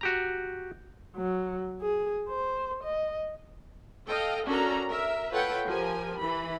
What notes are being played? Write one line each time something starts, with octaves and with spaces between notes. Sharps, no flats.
F#4 G4 A#5
F#3
G#4
C5
D#5
A4 D#5 F5 G5
C#4 D4 F#4 A4 A#4 A#5
A#4 E5
F4 A4 B4 C#5 F#5 G5
F3 G4 A#4 G#5
E3 B5